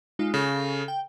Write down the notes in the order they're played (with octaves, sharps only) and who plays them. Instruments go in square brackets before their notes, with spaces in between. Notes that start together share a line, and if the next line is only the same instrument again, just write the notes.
[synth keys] G#3 D#4 F4
[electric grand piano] C#3 [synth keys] A4
[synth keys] G5